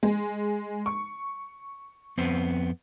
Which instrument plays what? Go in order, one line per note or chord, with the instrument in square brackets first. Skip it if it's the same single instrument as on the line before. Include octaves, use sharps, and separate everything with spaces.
[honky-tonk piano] G#3
C#6
[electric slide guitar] F2 B3 C4